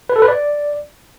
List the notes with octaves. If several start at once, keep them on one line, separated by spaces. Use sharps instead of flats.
B4
A4
B4
D5